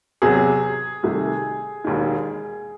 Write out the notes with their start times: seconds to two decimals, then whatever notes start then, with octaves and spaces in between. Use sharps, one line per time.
0.22 E2 C3 F#3 G#4
1.03 C2 C3 D#3 A3
1.84 E1 D#2 D#3